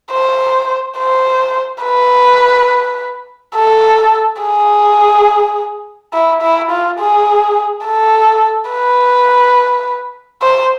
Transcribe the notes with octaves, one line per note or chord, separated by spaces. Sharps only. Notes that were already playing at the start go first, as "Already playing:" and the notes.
C5
C5
B4
A4
G#4
E4
E4
F4
G#4
A4
B4
C5